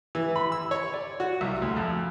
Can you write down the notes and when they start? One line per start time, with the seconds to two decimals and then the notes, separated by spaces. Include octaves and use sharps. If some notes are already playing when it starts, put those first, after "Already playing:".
0.15 E3
0.36 B5
0.52 E6
0.71 C#5
0.94 D5
1.20 F#4
1.41 C2
1.62 D2
1.76 F2